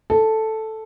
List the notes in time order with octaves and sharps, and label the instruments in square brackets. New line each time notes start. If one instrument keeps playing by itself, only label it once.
[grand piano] A4